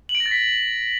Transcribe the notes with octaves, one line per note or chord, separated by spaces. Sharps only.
F#7
D7
A#6
A6
B6